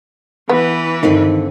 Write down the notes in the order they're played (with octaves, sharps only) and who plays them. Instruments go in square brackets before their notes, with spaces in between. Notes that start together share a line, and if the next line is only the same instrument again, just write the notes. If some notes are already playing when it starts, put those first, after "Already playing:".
[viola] E3 B4 [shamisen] B3
[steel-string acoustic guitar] G2 D3 C4 [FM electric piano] D#3